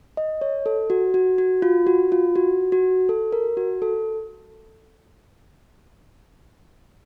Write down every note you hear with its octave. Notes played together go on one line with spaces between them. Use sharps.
D#5
C#5
A4
F#4
F#4
F#4
F4
F#4
F4
F#4
F#4
A4
A#4
F#4
A4